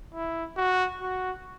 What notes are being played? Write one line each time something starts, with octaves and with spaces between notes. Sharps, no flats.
E4
F#4
F#4